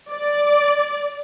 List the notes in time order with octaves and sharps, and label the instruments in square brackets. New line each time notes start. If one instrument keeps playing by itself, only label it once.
[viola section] D5